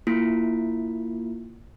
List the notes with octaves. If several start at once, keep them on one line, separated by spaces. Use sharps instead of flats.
A#3 E4 F4